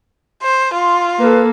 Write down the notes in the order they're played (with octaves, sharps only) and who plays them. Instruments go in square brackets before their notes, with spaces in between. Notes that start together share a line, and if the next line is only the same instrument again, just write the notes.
[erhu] C5
[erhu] F4 [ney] C6
[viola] A#3 A4 [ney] B4